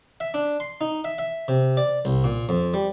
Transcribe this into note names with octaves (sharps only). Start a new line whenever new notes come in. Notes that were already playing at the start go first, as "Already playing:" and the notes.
E5
D4
C6
D#4
E5
E5
C3
D5
C2
A#2
F2
G3